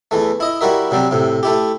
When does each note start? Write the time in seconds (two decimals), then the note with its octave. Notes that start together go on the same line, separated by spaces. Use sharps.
0.11 E2 E3 A3
0.40 E4 D#5
0.61 G3 E4 F#4 A#4 E5
0.91 C3 F#3 G3 C4
1.11 A2 C3
1.43 A3 E4 G4